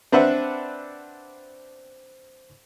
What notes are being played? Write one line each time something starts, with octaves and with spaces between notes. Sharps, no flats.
C4 D4 B4 C5 E5 F#5